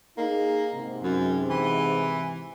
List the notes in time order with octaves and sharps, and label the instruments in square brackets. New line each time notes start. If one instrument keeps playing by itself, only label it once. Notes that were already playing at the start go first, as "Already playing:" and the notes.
[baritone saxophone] A#3 [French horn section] D#4 G#4
[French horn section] G#2 C3
[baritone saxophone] F#2
E3